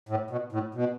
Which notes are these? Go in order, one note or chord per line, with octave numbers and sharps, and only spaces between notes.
A2
B2
A2
B2